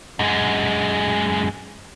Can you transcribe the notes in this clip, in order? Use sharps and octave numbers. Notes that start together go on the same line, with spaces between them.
F#2 G#3